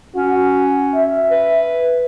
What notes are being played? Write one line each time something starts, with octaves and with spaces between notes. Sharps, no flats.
C#4 F#4
E5
B4